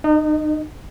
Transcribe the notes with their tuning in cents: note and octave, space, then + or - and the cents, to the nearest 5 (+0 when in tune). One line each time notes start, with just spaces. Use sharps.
D#4 -35 D#5 +0